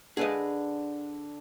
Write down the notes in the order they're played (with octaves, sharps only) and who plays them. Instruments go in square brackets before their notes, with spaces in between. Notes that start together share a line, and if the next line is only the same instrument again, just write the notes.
[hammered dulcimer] D3 [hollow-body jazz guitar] G#4 B4 D#5